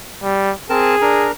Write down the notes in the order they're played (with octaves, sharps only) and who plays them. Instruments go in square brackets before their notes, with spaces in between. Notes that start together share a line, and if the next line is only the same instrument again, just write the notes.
[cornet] G3
[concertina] C4 A#4 A5 [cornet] G#4
[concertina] D4 A#4 A#5